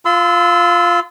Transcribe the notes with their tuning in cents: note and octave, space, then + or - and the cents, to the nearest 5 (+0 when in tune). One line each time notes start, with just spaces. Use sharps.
F4 +0 C6 -40 E6 -10